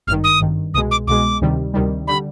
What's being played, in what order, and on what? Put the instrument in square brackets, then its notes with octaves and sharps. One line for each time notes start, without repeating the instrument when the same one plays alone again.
[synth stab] G#1 [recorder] F6
[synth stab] G2 D#3
[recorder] D#6
[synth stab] G#1 G2 D#3
[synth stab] C2 B2 G#3 [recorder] D#6
[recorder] D6
[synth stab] C2 B2 G#3 [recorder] D6
[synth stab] D2 C3 D#3 G3
D2 C3 D#3 G3
[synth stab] D3 G3 [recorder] B5